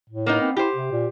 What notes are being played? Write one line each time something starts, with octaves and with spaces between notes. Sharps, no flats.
A2
A#3 B3 D#4
C4
E4 G4 C5
C3
A#2